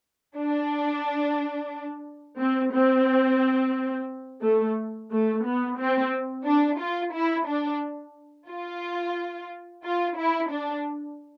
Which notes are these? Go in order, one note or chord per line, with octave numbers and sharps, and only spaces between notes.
D4
C4
C4
A3
A3
B3
C4
D4
F4
E4
D4
F4
F4
E4
D4